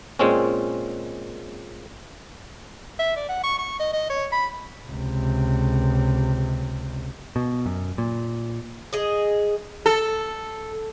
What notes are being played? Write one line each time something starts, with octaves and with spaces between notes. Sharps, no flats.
A#2 G#3 C4 C#4
E5
D5
F#5
C#6
C#6
D#5
D#5
C#5
B5
C#2 C3
B2
F#2
A#2
G#4 D#5
A4